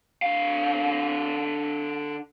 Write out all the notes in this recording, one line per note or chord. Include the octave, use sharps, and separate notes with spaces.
D3 F5